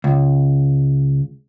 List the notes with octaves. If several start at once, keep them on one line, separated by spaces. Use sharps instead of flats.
C#2